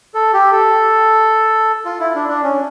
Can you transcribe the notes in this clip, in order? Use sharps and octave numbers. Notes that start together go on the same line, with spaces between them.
A4
G4
A4
F4
E4
D4
D4
C#4